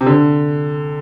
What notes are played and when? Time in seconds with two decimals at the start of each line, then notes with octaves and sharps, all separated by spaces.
0.01 C3
0.06 D3